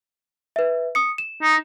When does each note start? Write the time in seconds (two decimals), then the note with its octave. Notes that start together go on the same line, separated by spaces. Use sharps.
0.56 B4 E5
0.95 D#6 C#7
1.18 E7
1.43 D#4